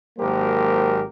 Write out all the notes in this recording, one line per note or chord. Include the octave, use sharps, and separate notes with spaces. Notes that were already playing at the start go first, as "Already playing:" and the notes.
G#1 F#3 A#3 G4 A#4 C5